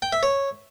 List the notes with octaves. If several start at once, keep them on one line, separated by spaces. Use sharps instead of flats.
G5
E5
C#5